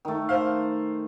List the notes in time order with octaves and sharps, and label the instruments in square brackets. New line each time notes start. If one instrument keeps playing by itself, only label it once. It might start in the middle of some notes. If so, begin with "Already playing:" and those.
[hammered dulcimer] D#3 A3
[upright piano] C5 F5